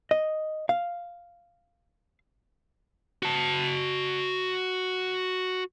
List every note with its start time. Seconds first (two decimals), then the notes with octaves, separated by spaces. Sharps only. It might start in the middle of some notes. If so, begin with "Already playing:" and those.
0.11 D#5
0.69 F5
3.23 F#4 A5